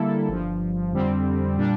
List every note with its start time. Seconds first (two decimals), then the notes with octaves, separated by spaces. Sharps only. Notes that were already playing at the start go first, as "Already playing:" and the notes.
Already playing: D3 G3 A#3 E4 A4
0.28 G1 G2 F3
0.92 F2 D3 G3 C4
1.57 A#2 G3 D4